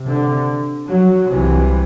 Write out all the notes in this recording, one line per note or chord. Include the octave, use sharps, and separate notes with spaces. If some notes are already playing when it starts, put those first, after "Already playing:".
Already playing: C3
D3
F#3
C2 C3 E3